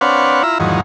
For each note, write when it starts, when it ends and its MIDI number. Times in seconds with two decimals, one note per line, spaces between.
0.01 0.43 60
0.01 0.43 62
0.01 0.43 71
0.01 0.43 73
0.01 0.43 77
0.01 0.43 78
0.43 0.58 64
0.43 0.58 65
0.43 0.58 76
0.43 0.58 82
0.60 0.81 40
0.60 0.81 44
0.60 0.81 51
0.60 0.81 53
0.60 0.81 54